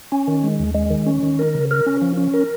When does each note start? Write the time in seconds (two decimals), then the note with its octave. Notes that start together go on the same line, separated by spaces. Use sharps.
0.12 C#4
0.28 D#3
0.43 G#3
0.59 D#2
0.75 G#3
0.90 D#3
1.06 C#4
1.23 D#3
1.39 A#4
1.55 C#3
1.71 A#4
1.86 C#4
2.02 F3
2.17 C#4
2.34 A#4